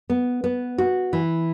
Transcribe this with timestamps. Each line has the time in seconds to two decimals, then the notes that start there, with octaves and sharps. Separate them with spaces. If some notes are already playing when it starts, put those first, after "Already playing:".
0.10 B3
0.44 B3
0.78 F#4
1.13 E3